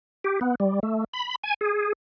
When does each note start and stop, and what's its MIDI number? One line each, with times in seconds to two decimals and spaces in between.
0.24 0.40 67
0.41 0.55 59
0.60 0.80 55
0.83 1.04 57
1.13 1.36 83
1.43 1.54 80
1.61 1.93 68